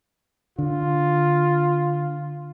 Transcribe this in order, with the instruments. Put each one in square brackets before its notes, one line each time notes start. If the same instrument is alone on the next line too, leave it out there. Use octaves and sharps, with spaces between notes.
[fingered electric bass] D3 [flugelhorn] F4